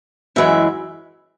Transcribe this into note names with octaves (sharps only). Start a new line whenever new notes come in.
F#2 E3 G#3 E5